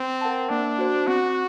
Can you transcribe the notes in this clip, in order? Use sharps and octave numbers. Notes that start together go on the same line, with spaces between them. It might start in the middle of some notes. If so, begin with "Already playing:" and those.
Already playing: C4
A#4 F#5 A5
A#3 D4
F#4 C5
C4 F#4